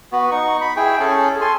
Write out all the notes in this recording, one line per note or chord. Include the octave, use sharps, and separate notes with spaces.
B3 F#4
D#4 C#6
B5
E4 G#4 G5
C#4 G#4 A4
A4 G#5 C6